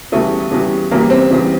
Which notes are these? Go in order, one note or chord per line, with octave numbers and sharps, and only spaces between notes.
E2 C#3 E3 G3 A3
E2 C#3 E3 G3
E2 C#3 E3 G3 A#3
C4
E2 C#3 E3 G3